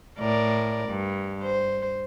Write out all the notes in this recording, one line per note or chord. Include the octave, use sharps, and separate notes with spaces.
A2 A#4 D5
G2
C5